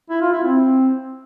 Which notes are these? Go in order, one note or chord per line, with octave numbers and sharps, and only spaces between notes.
E4
F4
E4
C4